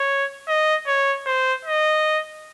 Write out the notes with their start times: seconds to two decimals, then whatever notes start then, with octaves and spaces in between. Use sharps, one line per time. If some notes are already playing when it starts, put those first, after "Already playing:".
Already playing: C#5
0.48 D#5
0.87 C#5
1.26 C5
1.65 D#5